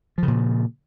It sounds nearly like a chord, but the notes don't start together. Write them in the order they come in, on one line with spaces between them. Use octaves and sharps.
F3 C#3 A#2